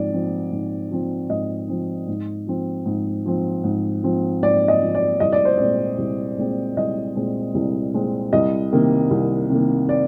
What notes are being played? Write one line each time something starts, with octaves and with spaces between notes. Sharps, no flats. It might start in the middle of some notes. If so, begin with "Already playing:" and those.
Already playing: G#2 F3 C4 D5
F3 C4
G#2
F3 C4
G#2 D#5
F3 C4
G#2
F3 C4
G#2
F3 C4
G#2
F3 C4
G#2 D5
D#5
F3 C4
D5
C2 D#5
D5
C5
A#2 G#3 C4 D5
C2
A#2 G#3 C4
C2 D#5
A#2 G#3 C4
C2
A#2 G#3 C4
C2 D#5
C3 D#3 A#3
C2
C3 D#3 A#3
D5